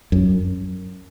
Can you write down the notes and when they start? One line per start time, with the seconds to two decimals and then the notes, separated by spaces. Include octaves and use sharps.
0.12 F#2